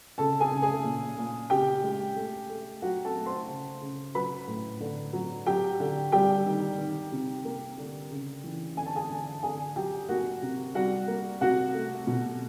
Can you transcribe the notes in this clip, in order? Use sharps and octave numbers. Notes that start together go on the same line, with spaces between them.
C#3 A4 A5
G#4 G#5
C#3
G#4 G#5
A#2
A#2
C#3 G4 G5
G#3
A3
A3
F#3 F#4 F#5
A4 A5
A3
C5 C6
C#3
C#3
F#3 B4 B5
A2
D3
F#3
F#3 G4 G5
D3
G3 G4 G5
D#3
D#3
C3
A#3
D3
C#3
E3
D3 G#5
A5
G#4 G#5
D3
D3 G#4 G#5
F#3 G4 G5
A#3 F#4 F#5
C3
G3 F#4 F#5
A#3
C3 F#4 F#5
A3
B2